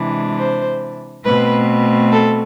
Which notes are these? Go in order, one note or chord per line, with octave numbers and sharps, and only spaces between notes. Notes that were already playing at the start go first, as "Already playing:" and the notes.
Already playing: C3 E3 G#3 D4
C5
B2 A3 C4 B4
A4